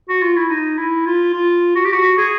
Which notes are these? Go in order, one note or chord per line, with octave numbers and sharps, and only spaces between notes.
F#4
F4
E4
D#4
E4
F4
F4
F#4
G4
F#4
G#4